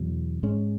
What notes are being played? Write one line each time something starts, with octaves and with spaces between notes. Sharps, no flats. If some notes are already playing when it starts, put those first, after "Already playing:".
Already playing: E2 B2 F#3
G#2 G#3 C#4